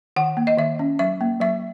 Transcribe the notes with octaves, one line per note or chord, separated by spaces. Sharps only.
D#3 F#5
A#3
D#5
D#3 E5
C#4
F#3 E5
A#3
F#3 E5